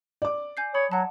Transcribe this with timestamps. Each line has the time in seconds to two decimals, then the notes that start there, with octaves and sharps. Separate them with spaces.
0.22 D5 D6
0.57 G#5 G6 C7
0.74 C#5 B5 D#6
0.92 F#3 F#5 A5